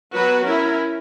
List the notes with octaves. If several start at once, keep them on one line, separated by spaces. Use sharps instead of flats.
F#3 B3 F#4 B4
C#4 E4 A#4